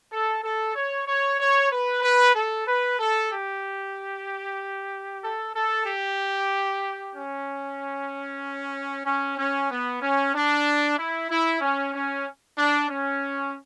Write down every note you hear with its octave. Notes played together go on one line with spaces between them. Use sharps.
A4
A4
C#5
C#5
C#5
B4
B4
A4
B4
A4
G4
A4
A4
G4
C#4
C#4
C#4
B3
C#4
D4
E4
E4
C#4
C#4
D4
C#4